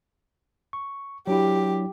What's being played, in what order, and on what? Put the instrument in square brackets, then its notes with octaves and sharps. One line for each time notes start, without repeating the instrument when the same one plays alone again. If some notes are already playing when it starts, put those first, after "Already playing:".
[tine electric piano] C#6
[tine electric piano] F#3 D4 E4 [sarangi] G4